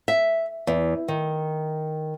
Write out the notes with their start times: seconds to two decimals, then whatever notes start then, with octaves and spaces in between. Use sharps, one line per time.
0.08 E5
0.67 E2
1.08 D#3